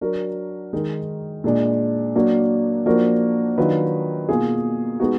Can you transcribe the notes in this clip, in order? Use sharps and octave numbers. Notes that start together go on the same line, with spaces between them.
F#3 D4 F#4 A#4
D#3 G#3 D#4 A#4
A#2 G#3 D4
F#3 A#3 D4 F#4
F3 A#3 D4 F#4 A#4
D#3 F#3 D4 F4 B4
B2 A#3 F4 G#4
G#3 B3 D#4 F#4